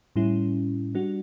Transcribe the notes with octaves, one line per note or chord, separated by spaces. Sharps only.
A2 G3 C#4 E4
G3 D4 F#4